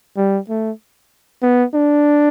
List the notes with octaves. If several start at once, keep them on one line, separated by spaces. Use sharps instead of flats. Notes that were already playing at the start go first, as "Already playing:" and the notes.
G3
A3
B3
D4